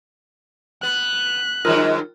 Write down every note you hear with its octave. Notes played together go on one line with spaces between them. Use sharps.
B3 F#6
G2 D#3 F#3 F4 A#4 F6